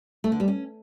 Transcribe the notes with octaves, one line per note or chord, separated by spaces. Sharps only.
A3
D3
G3
C#4